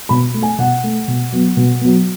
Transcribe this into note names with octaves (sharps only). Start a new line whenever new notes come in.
B2 B5
A3
G#5
B2 F#5
A3
B2
F#3 B3
B2
F#3 B3